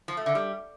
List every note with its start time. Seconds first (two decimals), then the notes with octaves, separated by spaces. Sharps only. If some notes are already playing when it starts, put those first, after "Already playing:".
0.08 F3
0.17 A3
0.26 D3
0.35 G3